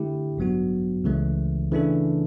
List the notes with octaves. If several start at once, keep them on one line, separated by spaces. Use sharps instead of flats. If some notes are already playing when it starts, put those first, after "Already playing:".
Already playing: D3 A3 E4 G4
A1 G2 F#3 B3 F#4
C#2 C#3 E3 A3
C#3 E3 A3 D4 A4